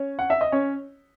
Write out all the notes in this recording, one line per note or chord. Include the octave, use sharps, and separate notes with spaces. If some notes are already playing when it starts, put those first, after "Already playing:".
Already playing: C#4 C#5
F#5
E5
D#5
C#4 C#5